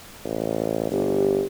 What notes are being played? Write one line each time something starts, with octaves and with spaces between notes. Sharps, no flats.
A1
G1 G4